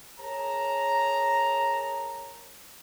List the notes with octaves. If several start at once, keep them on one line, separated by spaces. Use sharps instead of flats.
G#4 A#4 C#5 A5 A#5